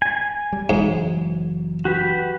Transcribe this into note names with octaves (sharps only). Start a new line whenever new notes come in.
G#5
G3
F#1 G#2 E3 F#3
F#4 G4 B4